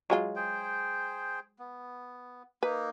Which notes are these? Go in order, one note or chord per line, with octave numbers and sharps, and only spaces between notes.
F#3 G#3 F4
G#4 C5 G5
B3
A#3 D#4 B4